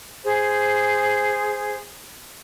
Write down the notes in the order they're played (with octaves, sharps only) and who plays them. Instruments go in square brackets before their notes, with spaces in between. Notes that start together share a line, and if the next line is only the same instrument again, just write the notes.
[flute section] G#4 C5